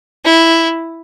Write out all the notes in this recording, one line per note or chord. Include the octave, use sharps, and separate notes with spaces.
E4